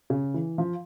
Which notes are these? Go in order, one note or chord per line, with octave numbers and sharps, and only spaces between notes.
C#3
E3
F3